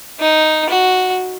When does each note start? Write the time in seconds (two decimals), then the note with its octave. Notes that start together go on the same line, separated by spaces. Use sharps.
0.20 D#4
0.69 F#4